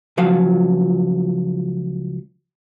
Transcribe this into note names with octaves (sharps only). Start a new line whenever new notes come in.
C#2 F3 F#3 F5